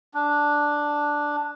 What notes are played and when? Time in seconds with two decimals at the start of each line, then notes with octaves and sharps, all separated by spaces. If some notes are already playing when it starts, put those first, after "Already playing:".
0.14 D4